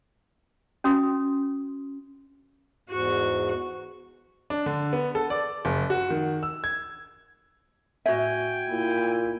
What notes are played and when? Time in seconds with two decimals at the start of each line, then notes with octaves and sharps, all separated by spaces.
0.84 C#4 F#4 D#6
2.89 E2 G#2 F#4
4.50 D4
4.66 D3
4.93 B3
5.15 A4
5.30 D5
5.65 F#1
5.90 F#4
6.10 D#3
6.43 E6
6.64 G#6
8.06 A2 F#4 E5 G5 G#5
8.69 A#2 E4